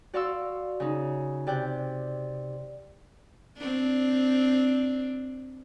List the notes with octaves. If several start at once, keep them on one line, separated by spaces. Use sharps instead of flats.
F#4 D5 F5 C6 C#6 E6
C#3 D#4
C3 D5 G5 F#6
C4 D4